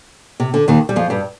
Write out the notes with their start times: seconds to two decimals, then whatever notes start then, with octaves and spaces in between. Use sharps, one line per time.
0.40 C3
0.54 D3
0.68 D#2 D#3
0.89 G3
0.96 F2 F3
1.10 G2 G3